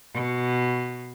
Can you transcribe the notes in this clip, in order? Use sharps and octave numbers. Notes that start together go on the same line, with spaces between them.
B2